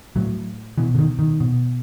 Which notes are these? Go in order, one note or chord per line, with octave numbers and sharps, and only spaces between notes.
A2 F#3
B2 E3
D3
D#3
D#3
B2